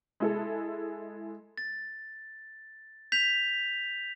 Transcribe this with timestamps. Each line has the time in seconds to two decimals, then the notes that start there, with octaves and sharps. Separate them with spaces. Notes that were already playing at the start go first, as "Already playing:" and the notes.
0.20 G#3 E4 A4
1.58 A6
3.12 G6 B6 F7